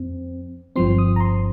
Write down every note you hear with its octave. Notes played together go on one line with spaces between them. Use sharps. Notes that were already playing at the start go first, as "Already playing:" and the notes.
Already playing: F2 C4
G1 G2 F3 C4 C6
D#6
A#5
C6